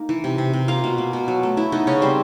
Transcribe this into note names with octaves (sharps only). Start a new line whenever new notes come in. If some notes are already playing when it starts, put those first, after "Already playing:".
Already playing: A#3 D#4
E3
C3
C3
C3
A#3 F4 F5
B2
A#3
B2
F#3
A3
B3 E4 E5
B3 D#4 D#5
C#3 C#4 C#5
G3 C4 C5